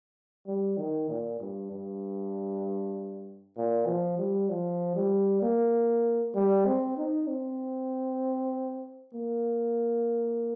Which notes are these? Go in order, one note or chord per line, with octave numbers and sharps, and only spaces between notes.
G3
D#3
A#2
G2
G2
A#2
F3
G3
F3
G3
A#3
G3
C4
D#4
C4
A#3